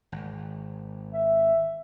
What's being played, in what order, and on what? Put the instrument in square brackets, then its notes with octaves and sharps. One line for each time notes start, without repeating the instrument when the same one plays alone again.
[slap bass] G#1
[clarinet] E5